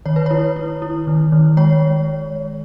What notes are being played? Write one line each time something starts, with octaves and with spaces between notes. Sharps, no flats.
D#3 C#5
B4
E4 C#5
E4
E4
D#3
D#3
G#3 C#5